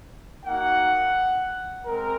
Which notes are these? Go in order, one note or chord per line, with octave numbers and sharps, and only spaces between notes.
A#3 D#4 F#4 F#5
G#3 C4 A#4